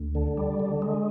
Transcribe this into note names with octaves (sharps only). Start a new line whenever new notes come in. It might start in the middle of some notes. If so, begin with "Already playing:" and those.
Already playing: D2
D3
G3
D3
G#3